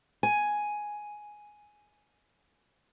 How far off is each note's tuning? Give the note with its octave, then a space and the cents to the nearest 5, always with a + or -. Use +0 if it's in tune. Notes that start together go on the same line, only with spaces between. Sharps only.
G#5 +5